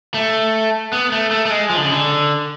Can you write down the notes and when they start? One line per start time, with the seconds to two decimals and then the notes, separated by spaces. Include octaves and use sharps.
0.14 A3
0.93 B3
1.12 A3
1.31 A3
1.46 A3
1.50 G#3
1.70 F3
1.77 D3
1.84 C#3
1.92 D3